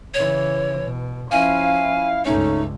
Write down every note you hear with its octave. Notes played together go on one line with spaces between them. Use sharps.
C#3 E3 C#5
B2
F3 C#4 E4 F5 G#5
C#2 G2 A3 C#4 D#4